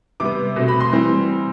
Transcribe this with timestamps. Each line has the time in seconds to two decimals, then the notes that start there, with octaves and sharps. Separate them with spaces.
0.20 C3 G3 B3 D6
0.56 B2 A3 C4
0.68 B5
0.80 C6
0.92 E3 G3 C4